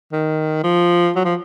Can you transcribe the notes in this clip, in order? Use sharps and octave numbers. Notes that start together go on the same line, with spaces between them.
D#3
F3
F#3
F3